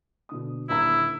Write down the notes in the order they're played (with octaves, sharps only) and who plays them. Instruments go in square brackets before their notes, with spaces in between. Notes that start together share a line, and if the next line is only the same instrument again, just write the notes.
[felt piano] B2 D3 D#6
[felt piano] D#1 D3 A#5 [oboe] E4